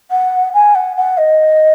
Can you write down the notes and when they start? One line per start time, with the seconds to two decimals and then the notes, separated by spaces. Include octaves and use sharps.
0.11 F#5
0.53 G#5
0.75 F#5
0.96 F#5
1.17 D#5